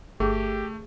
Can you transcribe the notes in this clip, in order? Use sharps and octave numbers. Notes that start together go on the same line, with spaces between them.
G1 A3 G4 G#4